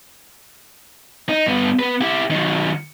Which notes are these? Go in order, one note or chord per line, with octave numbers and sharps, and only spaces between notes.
D#4
G2 B3
B3 B4
E4 G4
D#3 F#3